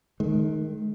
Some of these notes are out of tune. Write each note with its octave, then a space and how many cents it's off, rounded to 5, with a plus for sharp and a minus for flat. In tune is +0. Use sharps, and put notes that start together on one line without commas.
D#3 +0 G#3 +40